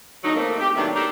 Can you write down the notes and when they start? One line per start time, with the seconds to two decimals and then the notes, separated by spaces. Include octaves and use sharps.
0.24 E2 D3 F#3 D#4
0.36 A3 A#3 C4
0.60 G4
0.75 A2 D#3 F#3 A3 B3 D4
0.95 D4 D#4 G4 A4 A#4